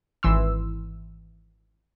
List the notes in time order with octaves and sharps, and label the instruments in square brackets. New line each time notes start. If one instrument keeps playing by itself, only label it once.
[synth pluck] G#1 E3 C6 E6